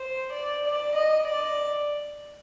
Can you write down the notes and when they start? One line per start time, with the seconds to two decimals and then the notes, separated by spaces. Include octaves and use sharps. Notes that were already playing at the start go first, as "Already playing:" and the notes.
Already playing: C5
0.32 D5
0.63 D5
0.94 D#5
1.25 D5